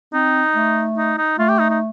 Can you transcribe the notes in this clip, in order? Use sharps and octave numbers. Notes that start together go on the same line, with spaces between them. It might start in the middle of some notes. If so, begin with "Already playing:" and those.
C4 D#4
A3
D#4
D#4
A3 F4
G4
D#4
D#4